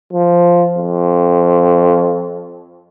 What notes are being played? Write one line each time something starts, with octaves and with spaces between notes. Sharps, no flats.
F3
F2